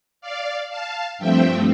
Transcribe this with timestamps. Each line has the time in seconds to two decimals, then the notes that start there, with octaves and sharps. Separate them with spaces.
0.21 D5 F5
0.69 F5 A5
1.18 G2 F3 A3 C4 E5 G5